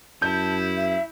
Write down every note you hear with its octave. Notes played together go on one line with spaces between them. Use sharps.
F#2 E4 A5 G6
E5